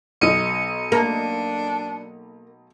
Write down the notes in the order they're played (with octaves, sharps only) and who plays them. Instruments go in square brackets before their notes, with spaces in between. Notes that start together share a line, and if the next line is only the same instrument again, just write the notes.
[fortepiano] B1 D#4 [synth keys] C#7 D#7
[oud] A#3 [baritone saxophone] D4